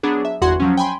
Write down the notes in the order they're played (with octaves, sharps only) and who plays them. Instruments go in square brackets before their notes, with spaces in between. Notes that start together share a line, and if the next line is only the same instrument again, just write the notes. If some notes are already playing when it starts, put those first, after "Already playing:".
[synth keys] F#3 B3 D4 G#4
E5
G1 E2 F#4 F#5 C6 G#6
F3 F#3 C#4
G5 G#5 B5 C6